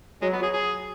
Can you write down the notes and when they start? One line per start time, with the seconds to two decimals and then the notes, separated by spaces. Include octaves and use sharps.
0.22 F#3 G#3
0.33 B3
0.43 G#4
0.53 G#4